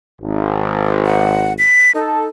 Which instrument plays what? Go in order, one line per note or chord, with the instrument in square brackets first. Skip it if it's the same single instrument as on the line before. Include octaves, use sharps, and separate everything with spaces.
[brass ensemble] G#1
[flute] F#5
B6
[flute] D#4 [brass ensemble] A4